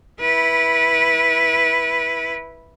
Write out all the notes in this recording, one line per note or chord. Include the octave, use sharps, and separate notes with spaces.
E4 B4